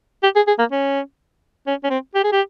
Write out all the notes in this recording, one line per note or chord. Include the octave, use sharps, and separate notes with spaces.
G4
G#4
G#4
A#3
C#4
C#4
C#4
C4
G4
G#4
G4